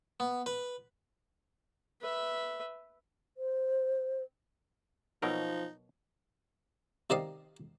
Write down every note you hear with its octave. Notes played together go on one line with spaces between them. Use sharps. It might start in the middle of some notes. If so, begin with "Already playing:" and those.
B3
B4
B4 E5
C5
B2 F3 F#3 D#4 A#4
C3 D#3 D5 D#5 F5 D#6